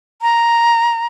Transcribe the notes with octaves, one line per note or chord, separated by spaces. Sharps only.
A#5